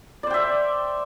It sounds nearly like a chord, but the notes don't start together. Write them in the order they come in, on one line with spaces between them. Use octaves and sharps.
D5 C5 G5 E5